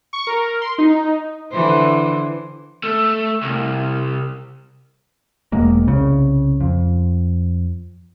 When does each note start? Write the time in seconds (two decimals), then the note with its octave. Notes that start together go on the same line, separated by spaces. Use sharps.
0.13 C#6
0.27 A#4
0.62 C6
0.78 D#4
1.52 D3 E3 C5
2.83 A3
3.43 C2
5.52 E1 G#3 A#3
5.86 C2 C#3
6.61 F2